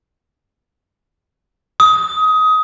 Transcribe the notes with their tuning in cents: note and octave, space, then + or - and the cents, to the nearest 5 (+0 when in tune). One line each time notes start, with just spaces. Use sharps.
D#6 +20